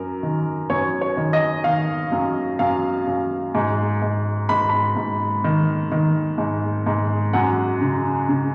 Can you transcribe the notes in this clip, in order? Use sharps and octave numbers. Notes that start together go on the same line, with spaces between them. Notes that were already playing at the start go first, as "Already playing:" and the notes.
Already playing: F#2 A#4
D#3
F#2 C#5
C#5
D#3
D#5
D#3 F5
F#2
F#2 F5
F#2
G#2
G#2
G#2 B5
B5
G#2
D#3
D#3
G#2
G#2
F#2 F#5
C#3
C#3